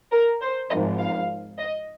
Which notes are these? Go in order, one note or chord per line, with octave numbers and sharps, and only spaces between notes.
A#4
C5
G#1 G#2 F3 D#5
F5
D#5